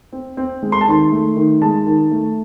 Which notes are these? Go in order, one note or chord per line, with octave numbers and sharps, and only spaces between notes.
C4
C4
G#3
C6
A5
D#3 C6
A3
D#3
G#3 A5
D#3
A3